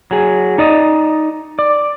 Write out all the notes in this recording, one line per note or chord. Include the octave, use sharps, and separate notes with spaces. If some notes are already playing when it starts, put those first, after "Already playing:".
F#3 G#4
D#4 D5 D#5
D5